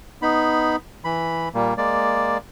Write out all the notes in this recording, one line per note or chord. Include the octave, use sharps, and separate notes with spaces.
B3 D#4 B5
E3 B5
A#2 G3 A#3
G#3 A#3 D5